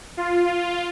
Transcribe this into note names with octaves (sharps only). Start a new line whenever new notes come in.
F4